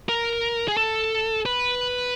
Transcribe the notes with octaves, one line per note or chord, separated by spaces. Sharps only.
A#4
G#4
A4
B4